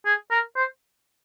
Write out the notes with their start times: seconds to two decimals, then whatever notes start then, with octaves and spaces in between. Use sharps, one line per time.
0.06 G#4
0.31 A#4
0.56 C5